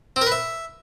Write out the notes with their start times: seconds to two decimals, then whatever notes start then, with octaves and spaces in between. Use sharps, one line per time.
0.16 C4
0.21 A#4
0.27 B4
0.32 E5